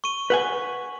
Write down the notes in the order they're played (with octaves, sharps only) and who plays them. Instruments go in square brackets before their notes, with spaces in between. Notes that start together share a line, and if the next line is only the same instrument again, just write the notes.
[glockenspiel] C#6 D#7
[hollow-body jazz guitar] B4 F#5 G#5